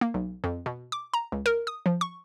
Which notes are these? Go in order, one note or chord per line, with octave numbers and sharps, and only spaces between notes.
A#3
B1
F2
B2
D6
A#5
C#2
A#4
D#6
F3
C#6